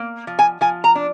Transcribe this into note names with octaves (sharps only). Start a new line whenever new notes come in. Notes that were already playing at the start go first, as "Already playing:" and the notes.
Already playing: A#3
F3
G#5
F3 G#5
A#5
D4